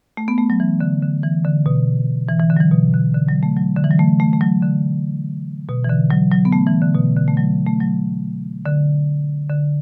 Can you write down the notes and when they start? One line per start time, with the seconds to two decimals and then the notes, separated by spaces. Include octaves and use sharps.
0.17 A3
0.28 B3
0.38 A3
0.50 F#3
0.60 E3
0.81 D3
1.02 D3
1.23 E3
1.45 D3
1.66 B2
2.29 E3
2.39 E3
2.50 D3
2.57 F#3
2.61 E3
2.71 B2
2.94 D3
3.14 D3
3.29 F#3
3.43 A3
3.57 F#3
3.76 D3
3.84 E3
3.91 F#3
3.99 A3
4.20 A3
4.33 A3
4.41 F#3
4.62 D3
5.69 B2
5.84 E3
5.89 D3
6.11 F#3
6.31 F#3
6.45 B3
6.53 A3
6.67 E3
6.81 D3
6.95 B2
7.17 D3
7.28 A3
7.37 F#3
7.67 A3
7.81 F#3
8.65 D3
9.50 D3